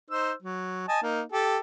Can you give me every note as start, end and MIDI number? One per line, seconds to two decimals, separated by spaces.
0.11 0.31 63
0.11 0.31 72
0.11 0.31 88
0.43 0.88 54
0.88 1.00 75
0.88 1.00 80
0.88 1.00 81
1.03 1.21 58
1.03 1.21 63
1.32 1.58 67
1.32 1.58 69